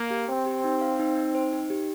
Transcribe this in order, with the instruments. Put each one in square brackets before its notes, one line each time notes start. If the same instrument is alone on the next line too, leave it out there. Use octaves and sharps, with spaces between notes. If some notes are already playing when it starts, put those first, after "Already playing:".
Already playing: [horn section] A#3
[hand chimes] G4
[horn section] C4 [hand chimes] C5
[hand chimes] G4
D#4
F5
D#4
D#4
C5
D#4
G4